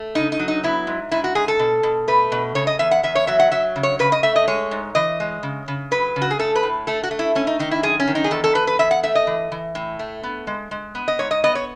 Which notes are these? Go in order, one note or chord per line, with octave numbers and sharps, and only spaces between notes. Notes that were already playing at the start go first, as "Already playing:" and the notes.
Already playing: A3
C#3 D#4
D#4
F#3
D#4
B3 E4
G#2
G#2 E4
F#4
G#2 G#4
A4
B2
B2
A3 B4
B2
C#3 C#5
D#5
E2 E5
F#5
E2 E5
C#5
F#3 E5
F#5
F#3 E5
C#3
C#5
C#3 B4
D#5
A3 E5
D#5
G#3 C#5
G#2
E3 D#5
G#3
C#3
C#3
F#3 B4
C#3
F#4
G#4
A3 A4
B4
A2
A3 A4
F#4
A3
E4
A3 C#4
D#4
D#3 D#4
E4
F#2 G#4
C#4
D#3
D#4
G#4
E2 A4
A4
E2 B4
B4
E2 E5
F#5
A3 E5
D#5
E3
E3
A2
A3
B3
G#3
G#3
B3
D#5
G#2 C#5
D#5
B3 D#5
C#5